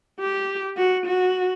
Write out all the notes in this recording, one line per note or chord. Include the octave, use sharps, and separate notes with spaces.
G4
F#4
F#4